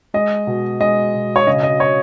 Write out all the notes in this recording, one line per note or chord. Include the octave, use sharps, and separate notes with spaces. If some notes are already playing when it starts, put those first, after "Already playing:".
G#3 D#5
B2
G#3 D#5
B2
C#5
C#3 D#5
D#5
C#5